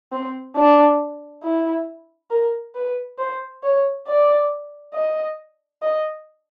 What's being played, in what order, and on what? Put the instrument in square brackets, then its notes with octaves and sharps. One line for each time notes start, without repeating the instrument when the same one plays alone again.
[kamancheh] C4
D4
E4
A#4
B4
C5
C#5
D5
D#5
D#5